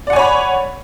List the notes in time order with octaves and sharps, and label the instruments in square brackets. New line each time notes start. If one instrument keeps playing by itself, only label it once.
[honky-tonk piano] D5
F#5
G#5
C#5
B5